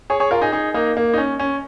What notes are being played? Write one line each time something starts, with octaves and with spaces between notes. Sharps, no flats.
G#4 C#5
G#4 C#5
F4 A#4
D#4 G#4
D#4 G#4
A#3 D#4
A#3
D#4
C#4
C#4